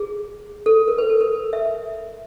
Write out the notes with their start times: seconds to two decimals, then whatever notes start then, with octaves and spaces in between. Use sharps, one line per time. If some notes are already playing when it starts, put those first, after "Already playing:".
Already playing: G#4
0.66 A4
0.88 A#4
0.98 B4
1.09 A4
1.21 A#4
1.53 E5